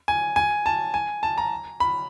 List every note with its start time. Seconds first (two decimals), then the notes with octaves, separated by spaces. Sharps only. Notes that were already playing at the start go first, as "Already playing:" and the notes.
0.08 G#5
0.36 G#5
0.66 A5
0.94 G#5
1.23 A5
1.38 A#5
1.80 B5